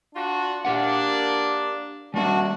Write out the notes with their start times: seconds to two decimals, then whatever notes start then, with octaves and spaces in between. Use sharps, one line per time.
0.15 D4 F4 F#4
0.65 A#3 D4 G4 A#4 F#5
2.14 G3 A#3 D4 F#4